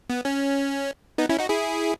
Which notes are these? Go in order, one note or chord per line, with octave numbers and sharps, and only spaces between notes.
B3
C#4
B3 D#4
C#4 E4
D#4 F#4
E4 G#4